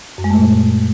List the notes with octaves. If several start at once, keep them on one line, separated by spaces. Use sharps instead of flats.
F#2
G#3
A3
A#2